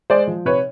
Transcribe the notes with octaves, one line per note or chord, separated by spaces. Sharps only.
G#3 C5 D5
F3
C3 B4 C#5